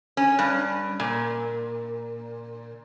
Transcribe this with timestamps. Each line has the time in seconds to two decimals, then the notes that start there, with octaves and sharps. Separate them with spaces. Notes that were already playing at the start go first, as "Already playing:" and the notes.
0.17 C#4
0.39 G2
1.00 A#2